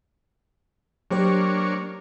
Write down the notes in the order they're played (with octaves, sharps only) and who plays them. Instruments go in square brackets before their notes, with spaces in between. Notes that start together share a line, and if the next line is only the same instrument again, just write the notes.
[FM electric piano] F#3 G4 C5 [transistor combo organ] A#3 D4 C#5